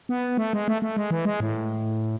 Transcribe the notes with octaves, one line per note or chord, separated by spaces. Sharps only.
B3
A3
G#3
A3
A3
G#3
E3
G#3
A2